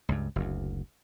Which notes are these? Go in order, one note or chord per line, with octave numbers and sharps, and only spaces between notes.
C#2 G2
F#1 D2